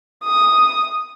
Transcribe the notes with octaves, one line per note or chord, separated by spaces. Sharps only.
D#6